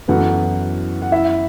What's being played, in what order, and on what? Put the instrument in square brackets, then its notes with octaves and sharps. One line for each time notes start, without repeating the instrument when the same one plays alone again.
[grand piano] F#2 E3 B3 E4 A4 [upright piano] F#4 F#5
[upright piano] F#5
E4 E5